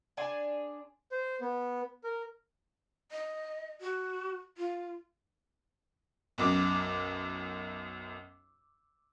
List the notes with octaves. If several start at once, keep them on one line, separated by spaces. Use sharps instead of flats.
D4 G#4 D5 G#5 C6
C5
B3
A#4
D#5
F#4
F4
B1 F#2 D6